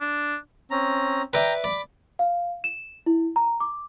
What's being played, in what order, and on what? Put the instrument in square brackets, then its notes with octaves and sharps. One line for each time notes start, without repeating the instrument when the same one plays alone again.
[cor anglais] D4
[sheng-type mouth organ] C4 C#4 A#5
[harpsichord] B4 D5 E5 [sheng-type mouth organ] G5 A#5
[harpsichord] D5 [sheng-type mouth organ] B5 D6
[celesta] F5
E7
E4
A#5
D6